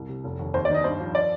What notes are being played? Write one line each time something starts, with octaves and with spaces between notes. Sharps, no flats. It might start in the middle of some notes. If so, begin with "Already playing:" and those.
Already playing: C2
C3
F1
D#2
D#2 C5
D5
D#3 D#5
G2 C5
F3
D5